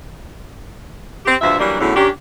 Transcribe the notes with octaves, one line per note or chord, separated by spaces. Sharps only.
C4 G4
D2 G2 F3 E5
E3 F#3 G3 A#3 D4
E2 A2 D3 E3 C#4 F#4
D#3 C#4 D4 G4